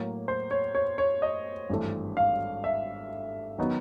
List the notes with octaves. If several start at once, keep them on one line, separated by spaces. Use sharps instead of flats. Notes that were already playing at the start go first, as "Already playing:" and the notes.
Already playing: A2 F#3 A#3
C5
C#5
C#5
C#5
D#5
G#1 G2 E3 A3
F5
E5
D#3 F#3 B3 D#4